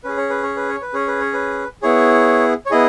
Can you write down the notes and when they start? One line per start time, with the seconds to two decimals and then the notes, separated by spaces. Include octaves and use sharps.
0.04 C#4 G#4 B4
0.17 C#5
0.30 B4
0.43 C#5
0.56 B4
0.69 C#5
0.82 B4
0.93 C#4 G#4 C#5
1.08 B4
1.20 C#5
1.33 B4
1.82 B3 E4 G#4 C#5
2.66 C#5
2.71 B3 E4 G#4 D#5